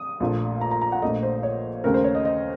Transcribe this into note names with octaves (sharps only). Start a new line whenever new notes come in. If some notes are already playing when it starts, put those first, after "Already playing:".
Already playing: D#6
A#1 A#2 A3
A#5
A#5
A#5
F#5
A#1 A#2 A3 D#5
C5
C#5
D#2 C#3 A3 A#4
C5
C#5
D#5
D#5